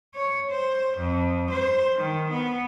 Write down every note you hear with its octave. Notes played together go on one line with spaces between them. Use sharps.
C#5
C5
F2
C5
D#3
B3